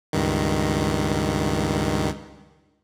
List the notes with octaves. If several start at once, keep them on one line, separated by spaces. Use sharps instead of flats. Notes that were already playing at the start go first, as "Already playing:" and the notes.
C#2 G2 D#3